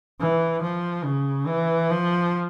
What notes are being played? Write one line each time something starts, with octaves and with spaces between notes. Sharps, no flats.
E3
F3
C#3
E3
F3